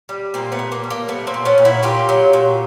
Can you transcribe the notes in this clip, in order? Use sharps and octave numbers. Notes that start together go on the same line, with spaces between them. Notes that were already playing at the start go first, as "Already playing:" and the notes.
G3
A#2 A#3 C4
A3 B3
A#2
A#3
G3
A#3
G3 A3 B3
A#3 C4
A#2
B3 C#4
A#2
E4 F#4
A#2 F4 G4
F#3
A#2